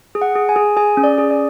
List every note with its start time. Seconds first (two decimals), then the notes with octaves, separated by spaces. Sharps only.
0.15 G#4
0.22 F#5
0.35 G#4
0.49 G#5
0.56 G#4
0.77 G#4 G#5
0.97 C#4
1.04 D5
1.18 G#4
1.31 D5